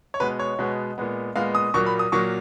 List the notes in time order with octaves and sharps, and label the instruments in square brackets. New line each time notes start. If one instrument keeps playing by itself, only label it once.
[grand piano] C#5
B2 G#3 B3 B4
C#5
B2 G#3 B3
A#2 G#3 B3
A#2 G#3 B3 F5
D#6
A#2 F#3 A#3 C#6
B5
D#6
A#2 F#3 A#3 C#6